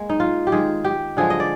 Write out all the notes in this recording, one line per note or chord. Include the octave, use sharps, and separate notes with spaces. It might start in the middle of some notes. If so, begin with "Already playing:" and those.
Already playing: G#3 A#3
D#4
F4
G4
D#3 G#3 G#4
G4
D3 F3 G#3 G#4
D#5
D5